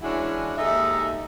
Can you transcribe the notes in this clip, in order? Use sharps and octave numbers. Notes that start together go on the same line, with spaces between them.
E3 G#3 C#4 D4 E4 F#4
D#2 G#3 D#4 A4 E5